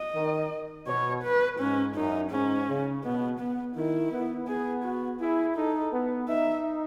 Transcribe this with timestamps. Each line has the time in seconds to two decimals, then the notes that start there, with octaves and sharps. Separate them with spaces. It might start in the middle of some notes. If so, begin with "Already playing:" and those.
Already playing: D#5
0.15 D#3
0.87 B2 C#5
1.23 B4
1.60 G#2 C#4
1.95 F#2 D#4
2.31 G#2 C#4
2.68 C#3
3.04 B2 B3
3.40 B3
3.76 D#3 E4
4.12 B3
4.48 B3 G#4
4.84 F#4
5.20 E4 G#4
5.56 D#4 A4
5.93 B3
6.28 D#4 E5